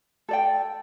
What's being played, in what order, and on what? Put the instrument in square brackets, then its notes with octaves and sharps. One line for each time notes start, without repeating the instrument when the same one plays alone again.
[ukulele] A4 D5 G5